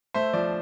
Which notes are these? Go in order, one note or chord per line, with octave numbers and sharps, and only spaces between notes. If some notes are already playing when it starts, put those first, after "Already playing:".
A3 C5 E5
F3 D5